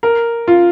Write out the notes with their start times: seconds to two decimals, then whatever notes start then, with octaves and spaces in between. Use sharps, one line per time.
0.03 A#4
0.48 F4